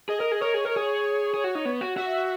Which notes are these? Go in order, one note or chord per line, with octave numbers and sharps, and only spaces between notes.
G#4 D#5
A#4
G#4
A#4 C#5
G#4
A#4
C#5
G#4
C#5
G#4
F#4
D#4
B3
F#4
F#4 E5